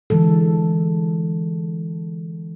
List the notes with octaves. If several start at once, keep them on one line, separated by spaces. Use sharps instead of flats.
D3 E3 G#3 A4